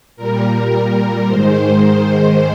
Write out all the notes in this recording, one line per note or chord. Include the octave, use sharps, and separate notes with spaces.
A#2 G3 A#4
A#4
G#2 D#3 G#3 C5